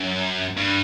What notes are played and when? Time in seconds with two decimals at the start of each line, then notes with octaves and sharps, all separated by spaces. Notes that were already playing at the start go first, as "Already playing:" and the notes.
Already playing: F#2
0.57 G2